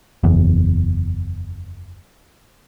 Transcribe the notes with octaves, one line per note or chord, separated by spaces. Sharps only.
F#1 E2